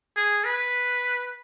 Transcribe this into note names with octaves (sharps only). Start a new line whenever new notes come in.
G#4
B4